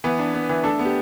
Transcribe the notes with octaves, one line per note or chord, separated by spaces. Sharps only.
E3 B3 B4
D4
B3
E3
A3 D4 A4
B3
G4